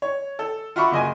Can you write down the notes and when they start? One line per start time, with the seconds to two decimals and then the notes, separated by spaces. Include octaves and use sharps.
0.02 C#5
0.39 A4
0.76 F4 F#4 E5 B5 C#6 D6
0.92 F#1 D#5 G#5